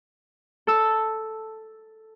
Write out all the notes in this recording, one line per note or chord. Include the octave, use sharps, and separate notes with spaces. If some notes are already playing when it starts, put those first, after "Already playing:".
A4 E6